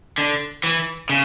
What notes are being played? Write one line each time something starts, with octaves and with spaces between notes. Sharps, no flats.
D3
E3
C#3